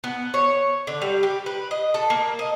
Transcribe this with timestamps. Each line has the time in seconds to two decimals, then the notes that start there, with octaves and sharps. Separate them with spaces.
0.04 B3
0.34 C#5
0.87 D3
1.02 G3
1.23 G4
1.46 B4
1.71 D#5
1.94 A4
2.10 A#3
2.39 D#5